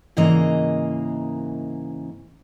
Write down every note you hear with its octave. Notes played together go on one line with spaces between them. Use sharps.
G#2 C#3 E3 A#3 D#5 A#5